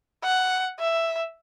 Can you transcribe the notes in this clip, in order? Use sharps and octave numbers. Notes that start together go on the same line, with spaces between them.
F#5
E5